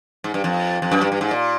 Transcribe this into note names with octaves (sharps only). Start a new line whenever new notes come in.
G#2
G2
F2
F2
F#2
G2
G2
G#2
A#2